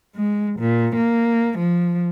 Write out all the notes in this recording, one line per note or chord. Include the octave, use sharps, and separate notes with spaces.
G#3
A#2
A#3
F3